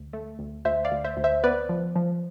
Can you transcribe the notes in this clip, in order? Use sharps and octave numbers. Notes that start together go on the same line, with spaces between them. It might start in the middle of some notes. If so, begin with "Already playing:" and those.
Already playing: D2
A3
D2
D2 C5 E5
D5 F5
D2
C5 E5
D2
C5 E5
B3 B4 D5
F3
F3